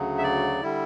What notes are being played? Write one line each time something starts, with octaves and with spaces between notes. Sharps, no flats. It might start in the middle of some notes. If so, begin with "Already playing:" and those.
Already playing: D2 C#3 F#3
E5
D5
D3 G3 E4